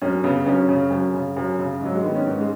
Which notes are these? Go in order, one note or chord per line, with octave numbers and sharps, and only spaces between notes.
F#2 C#4
C#3 B3
F#2 C#4
C#3
F#2
C#3
F#2
C#3
G#2 F#3
G#3
D#3 B3
C#4
G#2 D#4
G#3